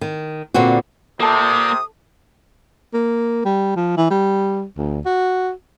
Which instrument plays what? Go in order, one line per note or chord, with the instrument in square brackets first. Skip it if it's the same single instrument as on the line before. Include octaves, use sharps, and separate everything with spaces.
[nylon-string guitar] D#3
A#2 D3 B3 C4 F#4
[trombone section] C3 [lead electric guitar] A#3 D5 [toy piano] A4 A5 [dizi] D#6
[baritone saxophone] A#3
G3
F3
E3
G3
D2
F#4